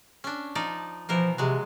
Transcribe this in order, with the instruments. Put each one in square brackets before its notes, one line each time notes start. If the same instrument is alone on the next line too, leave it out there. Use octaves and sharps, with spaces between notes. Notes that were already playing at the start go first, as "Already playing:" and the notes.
[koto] C#4 D4
F3 D#4 D5
[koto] B2 E3 A#4 [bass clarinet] F3
[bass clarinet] C3 [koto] F#3 G#3